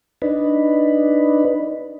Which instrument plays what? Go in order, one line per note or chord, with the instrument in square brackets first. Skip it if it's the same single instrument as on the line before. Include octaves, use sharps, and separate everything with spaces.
[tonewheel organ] D4 D#4 B4